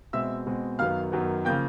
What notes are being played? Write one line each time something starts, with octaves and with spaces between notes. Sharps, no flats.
B2 G#3 C4 E5 E6
B2 G#3 C4
F#2 D#3 F#3 B3 F5 F6
F#2 D#3 F#3 B3
C#3 F3 A#3 G5 G6